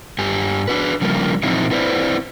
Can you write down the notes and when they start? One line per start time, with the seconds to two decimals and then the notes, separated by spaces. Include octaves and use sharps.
0.18 G2 G4 G#5
0.68 D4 F#4 B4
1.01 C#3 F3 G3 A#3
1.43 A#2 F3 F#3 C4 D#4 E4
1.71 C4 E4 B4 C5 D5